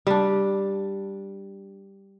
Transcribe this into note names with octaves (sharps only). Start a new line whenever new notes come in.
G3 D4